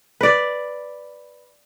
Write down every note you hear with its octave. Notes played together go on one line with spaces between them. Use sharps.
B4 D5